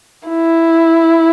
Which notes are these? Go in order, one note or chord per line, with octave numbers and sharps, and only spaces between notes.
E4